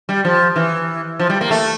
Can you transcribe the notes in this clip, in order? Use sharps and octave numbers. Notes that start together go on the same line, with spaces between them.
G3
F3
E3
F3
G3
A#3
A3